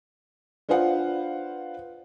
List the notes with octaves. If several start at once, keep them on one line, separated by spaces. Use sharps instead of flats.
D4 F4 B4 C5 F5 F#5